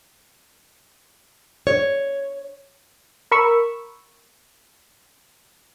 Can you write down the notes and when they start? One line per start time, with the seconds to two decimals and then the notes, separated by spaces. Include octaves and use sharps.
1.67 C#5
3.32 A#4 B5 C#6 E6